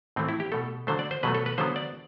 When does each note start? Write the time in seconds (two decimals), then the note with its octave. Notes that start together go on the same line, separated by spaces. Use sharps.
0.16 A2 E3 A3 C4
0.29 E4
0.40 G4
0.52 B2 A3 A4
0.87 D3 F#3 A3 C5
0.99 D5
1.11 C5
1.23 B2 F#3 A3 B4
1.35 A4
1.46 B4
1.58 D3 F#3 B3 C5
1.76 D5